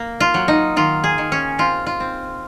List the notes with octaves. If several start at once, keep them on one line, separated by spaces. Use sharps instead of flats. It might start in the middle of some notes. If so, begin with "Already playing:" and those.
Already playing: A#3
F4
F#3
D#4
D#3 F4
G#4
D#3
C#4
C4 F4
F4
C4